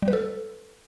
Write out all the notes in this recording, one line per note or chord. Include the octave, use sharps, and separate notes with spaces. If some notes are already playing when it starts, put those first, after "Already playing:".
G3
B4
A4